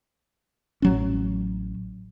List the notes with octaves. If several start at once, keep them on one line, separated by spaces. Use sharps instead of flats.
A1 F#3 C#4